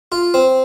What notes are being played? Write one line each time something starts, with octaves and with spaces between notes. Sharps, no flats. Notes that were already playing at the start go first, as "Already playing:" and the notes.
F4
C4